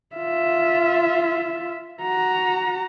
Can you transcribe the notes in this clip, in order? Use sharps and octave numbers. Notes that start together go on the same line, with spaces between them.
F4 E5
F#4 A#5